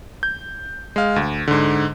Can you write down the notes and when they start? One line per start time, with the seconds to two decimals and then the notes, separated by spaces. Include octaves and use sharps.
0.23 G6
0.96 G#3 F5
1.16 D2
1.47 G#2 D3